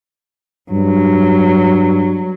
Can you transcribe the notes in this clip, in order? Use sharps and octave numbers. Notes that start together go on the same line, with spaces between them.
G2 F#3